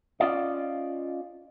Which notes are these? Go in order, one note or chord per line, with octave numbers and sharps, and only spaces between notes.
C#4 F4 D5 D#5